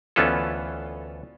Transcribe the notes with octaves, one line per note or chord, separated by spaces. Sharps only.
D2 E3 B3 C#4 F4 A4